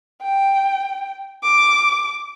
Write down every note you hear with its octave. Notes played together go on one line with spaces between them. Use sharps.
G5
D6